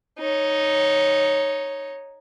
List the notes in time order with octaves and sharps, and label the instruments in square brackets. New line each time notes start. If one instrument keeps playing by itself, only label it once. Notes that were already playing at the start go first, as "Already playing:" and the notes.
[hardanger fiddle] D#4 C#5